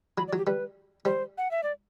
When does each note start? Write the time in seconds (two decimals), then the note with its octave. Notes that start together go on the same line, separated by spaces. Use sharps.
0.17 F#3 B5
0.28 D5
0.33 F#3 F#4
0.38 G4
0.46 G3 B4
1.05 G3 C5
1.38 F#5
1.51 E5
1.63 D5